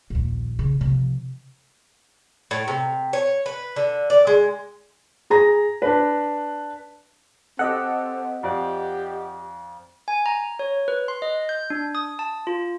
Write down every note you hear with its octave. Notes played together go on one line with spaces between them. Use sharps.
A#1 D#2
C#3
C3 F3
A2
C3
C#5
B4
D3
D5
G#3
G#4 A#5 A#6
D4 B4
C4 G4 A4 D#5 F#5
F2 G4 D5
G#5
A#5
C#5
B4
C6
D#5
G6
D4
D#6
A5
F4